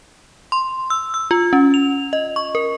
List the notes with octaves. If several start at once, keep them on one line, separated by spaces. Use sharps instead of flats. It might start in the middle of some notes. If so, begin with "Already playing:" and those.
C6
E6
E6
F4
C#4
F7
D#5
C#6
A#4